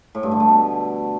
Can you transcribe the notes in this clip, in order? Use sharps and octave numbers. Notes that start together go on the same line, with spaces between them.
A2
G2
D3
A3
B2